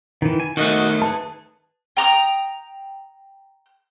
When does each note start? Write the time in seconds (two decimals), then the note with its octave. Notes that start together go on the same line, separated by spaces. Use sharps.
0.22 D#3 E3
0.40 G#5
0.57 D#3 A3 F#4 D#5 F#6
1.02 G#4 B4 A5
1.97 G5 A#5 D6 D#6